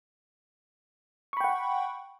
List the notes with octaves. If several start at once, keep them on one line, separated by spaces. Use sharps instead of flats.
F#5 G5 B5 C#6